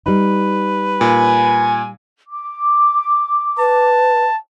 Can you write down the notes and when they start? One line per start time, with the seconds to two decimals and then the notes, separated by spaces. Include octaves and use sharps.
0.06 G3 D#4 B4
1.01 A#2 G#5
2.28 D6
3.58 B4 A5